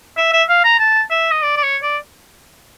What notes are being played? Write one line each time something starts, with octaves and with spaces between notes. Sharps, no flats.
E5
E5
F5
A#5
A5
E5
D#5
D5
D5
C#5
D5